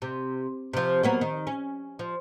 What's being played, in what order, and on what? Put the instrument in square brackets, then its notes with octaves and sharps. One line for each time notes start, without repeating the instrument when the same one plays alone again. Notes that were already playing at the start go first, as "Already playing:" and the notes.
[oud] C3
C3 F3
F#3 A#3 B3
D#3
C#4
F3